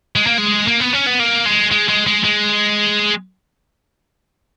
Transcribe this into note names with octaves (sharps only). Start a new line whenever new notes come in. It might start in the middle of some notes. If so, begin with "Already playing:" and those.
G#3
A#3
G#3
A#3
B3
C#4
B3
A#3
G#3
G#3
G#3
G#3
G#3